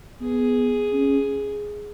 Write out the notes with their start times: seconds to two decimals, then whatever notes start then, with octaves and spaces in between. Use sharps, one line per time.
0.21 B3 G#4
0.92 C#4